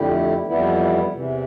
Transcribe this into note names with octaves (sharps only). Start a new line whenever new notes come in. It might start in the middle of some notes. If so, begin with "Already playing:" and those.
Already playing: F2 D3 A3 E4 G4
F2 E3 G3 B3 E4
E2 C3 E3